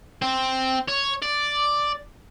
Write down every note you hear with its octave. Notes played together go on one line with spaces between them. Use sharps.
C4
C#5
D5